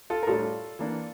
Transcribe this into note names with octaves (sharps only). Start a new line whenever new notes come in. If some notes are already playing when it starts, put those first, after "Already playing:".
F4 A4
A#4
A2 G3 D4 F4 A4
E3 A#3 D4